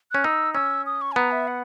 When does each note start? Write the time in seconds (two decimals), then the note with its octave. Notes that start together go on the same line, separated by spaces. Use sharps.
0.11 C#4 F#6
0.24 D#4 E6
0.54 C#4 E6
0.86 D#6
1.01 C#6
1.12 G#5
1.16 B3 A#5
1.32 E5
1.47 F#5